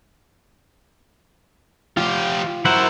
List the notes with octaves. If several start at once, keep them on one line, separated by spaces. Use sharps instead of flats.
F3 F4 G4
F#3 E4 A#4 C5 F#5